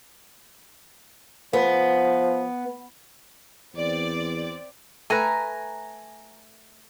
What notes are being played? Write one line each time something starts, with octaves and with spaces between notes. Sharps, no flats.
F3 B3
E2 C4 D5
A3 B4 G#5 A#5